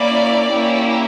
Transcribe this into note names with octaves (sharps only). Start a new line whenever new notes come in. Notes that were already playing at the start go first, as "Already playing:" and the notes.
Already playing: A#3 C#4 E4 D5
A#3 C#4 E4 G4